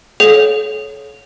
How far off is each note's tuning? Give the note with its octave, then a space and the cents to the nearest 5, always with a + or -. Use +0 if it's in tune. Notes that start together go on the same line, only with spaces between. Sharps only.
A4 -45 C#5 +5 F5 +35